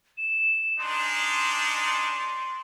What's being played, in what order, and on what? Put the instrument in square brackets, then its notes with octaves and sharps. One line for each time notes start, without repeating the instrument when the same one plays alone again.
[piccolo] E7
[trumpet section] G#3 D4 D#4 [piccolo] C6